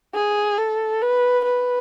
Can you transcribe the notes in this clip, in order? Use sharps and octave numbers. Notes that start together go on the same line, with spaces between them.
G#4
A4
B4
B4